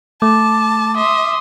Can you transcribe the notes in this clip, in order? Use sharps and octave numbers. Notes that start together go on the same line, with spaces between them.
A3 A5 D6
E5 C6 D#6